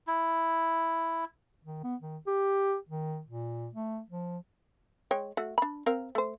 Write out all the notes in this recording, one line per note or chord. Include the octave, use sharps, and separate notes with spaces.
E4
D#3
B3
D#3
G4
D#3
A#2
A3
F3
G#3 C#5 G5
A3 F#4
D4 B5
C4 A#4 F5
A3 C5